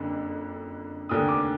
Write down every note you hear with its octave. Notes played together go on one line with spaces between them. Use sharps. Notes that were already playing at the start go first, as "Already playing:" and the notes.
Already playing: F#1 F2 D3
F1 D#2 D3 D#6
D6